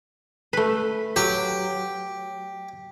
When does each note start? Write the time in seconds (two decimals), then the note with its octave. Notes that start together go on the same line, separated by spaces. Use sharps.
0.53 A3 B4
1.16 F#3 G4